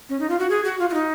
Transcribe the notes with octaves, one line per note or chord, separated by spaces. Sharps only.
C#4
D#4
F4
F#4
G#4
F#4
F4
F4
D#4